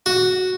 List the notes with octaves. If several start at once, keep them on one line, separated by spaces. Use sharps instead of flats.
F#4